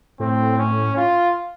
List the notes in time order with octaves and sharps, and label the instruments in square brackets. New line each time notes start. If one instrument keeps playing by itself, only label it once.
[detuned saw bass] A2 [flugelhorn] C4
[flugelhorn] C#4
F4